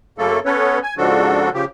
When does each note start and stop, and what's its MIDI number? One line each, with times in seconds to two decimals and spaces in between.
0.18 0.39 42
0.18 0.39 49
0.18 0.39 57
0.18 0.39 58
0.18 0.39 69
0.45 0.79 59
0.45 0.79 61
0.45 0.79 69
0.45 0.79 71
0.45 0.79 73
0.83 0.94 80
0.98 1.49 44
0.98 1.49 49
0.98 1.49 53
0.98 1.49 62
0.98 1.49 66
0.98 1.49 69
1.54 1.65 49
1.54 1.65 53
1.54 1.65 67